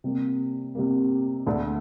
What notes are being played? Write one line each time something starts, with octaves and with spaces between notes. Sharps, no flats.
C3 G3 A#3
C3 G3 A#3
D2 D3 A3 D4 A4